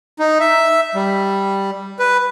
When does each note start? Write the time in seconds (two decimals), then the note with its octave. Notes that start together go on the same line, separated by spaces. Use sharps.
0.19 D#4
0.40 E5
0.95 G3
1.99 B4